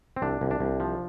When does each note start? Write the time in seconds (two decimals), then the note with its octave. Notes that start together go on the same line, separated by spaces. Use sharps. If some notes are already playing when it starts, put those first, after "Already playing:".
0.16 C4
0.22 C2 D4
0.41 C2
0.51 D4
0.60 C2
0.80 F3